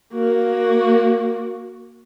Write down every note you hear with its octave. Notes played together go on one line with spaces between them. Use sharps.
A#3 F#4